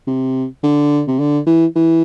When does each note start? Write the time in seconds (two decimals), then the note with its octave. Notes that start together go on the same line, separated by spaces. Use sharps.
0.07 C3
0.63 D3
1.08 C3
1.20 D3
1.46 E3
1.75 E3